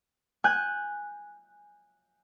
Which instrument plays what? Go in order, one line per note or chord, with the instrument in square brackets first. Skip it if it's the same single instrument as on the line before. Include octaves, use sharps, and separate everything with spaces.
[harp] G#5 F#6 G6